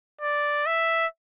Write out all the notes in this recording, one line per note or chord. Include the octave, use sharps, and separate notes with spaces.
D5
E5